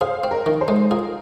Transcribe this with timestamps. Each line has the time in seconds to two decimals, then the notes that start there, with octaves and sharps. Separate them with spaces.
0.01 G#4 C5 F5
0.24 C4
0.31 A#4 D#5
0.46 D#3
0.61 G#4 C5
0.68 G#3
0.91 F4 G#4 A#4